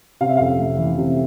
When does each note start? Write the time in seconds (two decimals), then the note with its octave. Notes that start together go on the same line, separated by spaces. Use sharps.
0.21 C3 F5
0.29 E5
0.37 F2 F5
0.59 F1
0.78 E3
0.98 C3